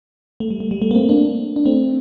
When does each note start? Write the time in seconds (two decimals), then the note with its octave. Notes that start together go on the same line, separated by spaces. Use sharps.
0.40 A3
0.50 G3
0.60 A3
0.71 G3
0.82 A3
0.91 A#3
0.95 A3 C4
1.09 A#3 D4
1.56 D4
1.65 A3 C4